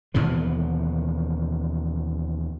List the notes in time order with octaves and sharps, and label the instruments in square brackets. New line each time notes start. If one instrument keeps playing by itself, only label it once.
[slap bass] D#2 B2 E3 F3